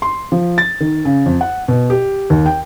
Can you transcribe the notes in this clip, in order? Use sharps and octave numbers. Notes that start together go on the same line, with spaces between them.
C6
F3
A6
D#3
C#3
F2
F#5
B2
G4
D#2
G5